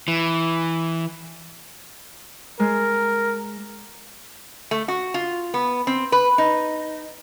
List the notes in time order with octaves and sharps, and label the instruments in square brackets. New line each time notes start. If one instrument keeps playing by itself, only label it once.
[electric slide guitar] E3
[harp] G#3 [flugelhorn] A#4
[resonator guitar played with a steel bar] A3
F#4
F4
B3
C4
B4
D#4